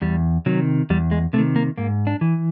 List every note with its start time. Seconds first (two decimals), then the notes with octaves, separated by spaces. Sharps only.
0.02 E2 G3
0.46 C3 D#3 F#3
0.90 E2 G3
1.11 G#3
1.33 C3 A3
1.38 D#3
1.56 A#3
1.78 G#2 A#3
2.07 D4
2.21 E3